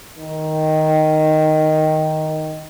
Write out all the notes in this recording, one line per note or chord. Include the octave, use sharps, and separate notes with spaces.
D#3